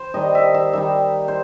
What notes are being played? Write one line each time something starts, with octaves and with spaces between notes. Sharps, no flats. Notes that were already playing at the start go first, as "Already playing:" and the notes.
Already playing: C5
D#3 G3 D#4 D#5
E5
E5
D#3 G3 D#4 E5
C5